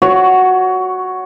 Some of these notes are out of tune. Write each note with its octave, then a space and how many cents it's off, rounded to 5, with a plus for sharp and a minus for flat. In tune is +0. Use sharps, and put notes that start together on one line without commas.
F#4 +0 C#5 +20